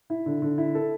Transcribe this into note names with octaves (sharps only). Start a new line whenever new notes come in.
E4
D3
D3
E4
A4